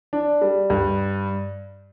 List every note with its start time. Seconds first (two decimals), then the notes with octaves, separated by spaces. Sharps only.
0.13 D4
0.41 G3
0.70 G2